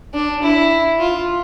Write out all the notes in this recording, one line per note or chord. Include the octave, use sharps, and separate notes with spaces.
D4
E4
F4